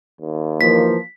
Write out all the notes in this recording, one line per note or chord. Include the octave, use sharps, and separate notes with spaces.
D#2
E3 F3 A#3 B6